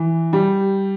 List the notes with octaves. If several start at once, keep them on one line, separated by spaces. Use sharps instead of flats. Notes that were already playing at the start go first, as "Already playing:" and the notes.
Already playing: E3
G3